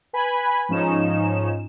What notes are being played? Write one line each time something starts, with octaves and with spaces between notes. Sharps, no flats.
B4 G#5 B5
G#2 F3 C#4 D#4 E7